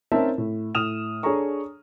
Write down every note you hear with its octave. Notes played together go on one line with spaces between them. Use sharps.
C4 C#4 D#4 A#4 E5 A5
A2
A2 D#6 F6 E7 F7
D4 G#4 A4 C#5 A#5 C#6